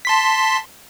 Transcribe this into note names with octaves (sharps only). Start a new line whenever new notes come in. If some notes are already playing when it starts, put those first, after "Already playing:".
A5 C6 B6